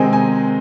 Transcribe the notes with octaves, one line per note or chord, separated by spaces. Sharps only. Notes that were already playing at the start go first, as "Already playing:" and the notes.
Already playing: C3 D#3 G#3 C4 D#4 G#5
G#5